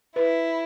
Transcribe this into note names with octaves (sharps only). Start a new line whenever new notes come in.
E4 B4